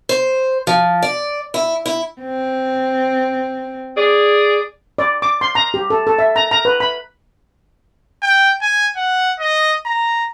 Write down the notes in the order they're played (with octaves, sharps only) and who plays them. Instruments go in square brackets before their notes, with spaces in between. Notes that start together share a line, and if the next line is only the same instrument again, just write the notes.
[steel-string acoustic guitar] C5
F3
D5
E4
E4
[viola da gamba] C4
[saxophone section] G#4 D5
[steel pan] D5
D6
C6
A#5
G4
A4
A4
E5
A#5
A#5
B4
B5
[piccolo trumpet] G5
G#5
F#5
D#5
A#5